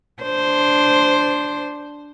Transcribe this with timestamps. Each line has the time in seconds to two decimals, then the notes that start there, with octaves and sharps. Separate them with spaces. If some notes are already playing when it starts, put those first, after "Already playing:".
0.23 D4 C5